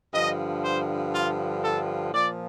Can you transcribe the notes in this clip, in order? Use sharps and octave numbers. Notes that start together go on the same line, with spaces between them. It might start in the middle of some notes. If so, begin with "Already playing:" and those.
G2 D3 F3 D#5
C5
F4
A4
A#2 F3 D5